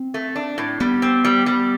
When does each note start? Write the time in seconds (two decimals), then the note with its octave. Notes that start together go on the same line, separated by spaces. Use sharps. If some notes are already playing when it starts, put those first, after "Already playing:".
Already playing: C4
0.14 A3
0.36 D4
0.58 A2
0.80 G3 B3
1.02 C4
1.25 G3
1.46 G3